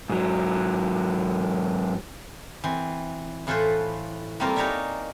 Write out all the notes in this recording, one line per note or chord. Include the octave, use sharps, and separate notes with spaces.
G#2 F#3
E3 C4
A2 E3 F4 A4 B4 C5
G3 A3 A#3 C4 F4 A#4
D#4 G#4 A#4 C#5 D5 E5